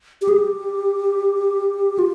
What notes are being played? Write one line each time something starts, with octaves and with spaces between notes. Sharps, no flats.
G4
G#4
G4
F4